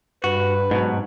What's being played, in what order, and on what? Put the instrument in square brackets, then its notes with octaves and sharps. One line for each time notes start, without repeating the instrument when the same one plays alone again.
[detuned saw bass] G2 [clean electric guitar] F#4 [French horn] B4
[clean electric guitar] G#2 B2 F#3